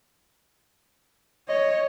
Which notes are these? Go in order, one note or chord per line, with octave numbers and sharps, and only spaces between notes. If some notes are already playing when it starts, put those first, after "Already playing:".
C#5 D#5